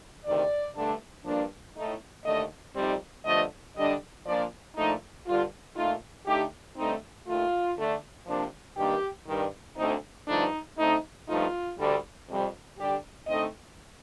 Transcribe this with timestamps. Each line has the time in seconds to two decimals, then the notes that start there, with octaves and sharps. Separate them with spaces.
0.25 D2 C3 D#3 D5
0.75 G2 D3 A3 D4
1.25 G2 F3 A#3 D4
1.76 A2 A3 D#4
2.25 D#2 D3 A3 D#5
2.75 F2 C3 G3 C4 D#4 D5
3.25 G2 D3 F3 A3 D#5
3.75 D3 G3 D4 D#5
4.25 A#2 F3 A#3 D4 D5
4.75 A#2 F3 A3 D4 D#4
5.26 G2 D3 G3 F4
5.75 A#2 A3 D#4 F4
6.26 D3 A3 D#4 G4
6.76 G2 D3 A3 C4 D#4
7.26 D#2 D#3 A3 F4
7.77 D3 A3 D4
8.26 C3 F3 A#3 D4
8.77 G2 D#3 A#3 D4 G4
9.27 G2 D#3 G3
9.76 D2 D3 A3 C4 D#4
10.27 G2 D3 F3 A3 D4 D#4
10.78 D3 A3 C4 D#4
11.27 G2 F3 A3 D#4 F4
11.78 D2 D3 G3
12.28 F2 C3 G3
12.78 D3 G3 D4 G4
13.27 D3 A3 C4 D#4 D#5